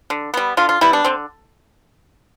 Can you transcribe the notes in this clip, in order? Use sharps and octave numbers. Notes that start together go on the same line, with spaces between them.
D3
G3 B3
D3 F4
F4
G3 B3 E4
D4
D3 C4